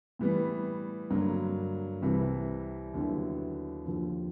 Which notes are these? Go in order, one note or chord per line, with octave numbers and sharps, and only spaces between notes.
A2 E3 G3 B3
G2 D3 F#3 A#3
C2 C3 E3 G3
D#2 D3 F#3 B3 E4
D#2 D3 F3